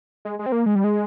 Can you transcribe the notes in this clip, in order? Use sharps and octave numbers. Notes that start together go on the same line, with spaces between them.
G#3
G#3
C4
A#3
G#3
G3
G#3